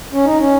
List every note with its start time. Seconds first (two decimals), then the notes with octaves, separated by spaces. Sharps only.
0.13 C#4
0.25 D#4
0.39 C#4